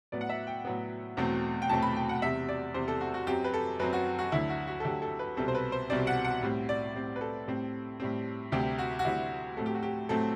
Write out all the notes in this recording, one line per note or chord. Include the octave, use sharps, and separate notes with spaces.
A2 F#3 B3 D5
F#5
E5
G5
A2 F#3 B3
E2 B2 F#3 A3 C4
G5
E2 B2 F#3 A3 C4 A5
B5
G5
F#5
E2 C3 G3 C4 E5
D5
E2 C3 G3 C4 C5
A4
F#4
F#4
F#2 F#3 C4 G4
B4
A4
F#2 F#3 C4 B4
F#4
F#4
D2 D3 F#3 E4
F#4
F#4
A4
D2 D3 F#3 G4
A4
B4
C2 B2 G3 C4 A4
C5
B4
C5
C2 B2 G3 C4 D5
F#5
F#5
A2 G3 C4
D5
A2 G3 C4
B4
A4
A2 G3 C4
A2 G3 C4
D2 C3 G3 C4 G4
F#4
F#4
D2 C3 G3 C4 E4
A2 F#3 A3 C4 A4
G4
F#4
G4
A2 F#3 A3 C4 A4